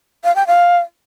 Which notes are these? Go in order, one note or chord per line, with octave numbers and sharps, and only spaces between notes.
F5
G5
F5